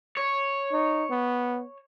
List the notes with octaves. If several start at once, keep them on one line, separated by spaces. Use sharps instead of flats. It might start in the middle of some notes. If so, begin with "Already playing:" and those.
C#5
D#4
B3